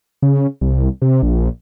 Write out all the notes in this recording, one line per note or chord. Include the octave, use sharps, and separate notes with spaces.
C#3
C2
C3
A#1